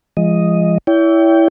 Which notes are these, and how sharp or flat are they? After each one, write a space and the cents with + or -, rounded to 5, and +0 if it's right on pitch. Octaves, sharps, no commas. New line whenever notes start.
F3 -35 G#3 -15 D#5 +0
E4 +0 C#5 +40 G5 -5